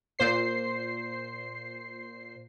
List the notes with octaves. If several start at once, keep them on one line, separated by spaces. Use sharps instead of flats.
A#2 C5 C7